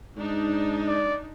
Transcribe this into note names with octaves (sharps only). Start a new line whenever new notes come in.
G#2 D4 D#4
D5